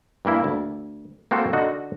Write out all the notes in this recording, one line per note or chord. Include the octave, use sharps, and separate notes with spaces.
G2 E3 A#3 E4
D2
A#3 C4 F#4 A4 C5 G5
D3 D#4 F#4 D#5